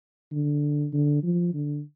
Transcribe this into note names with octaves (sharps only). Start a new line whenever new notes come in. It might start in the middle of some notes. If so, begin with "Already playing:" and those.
D3
D3
F3
D3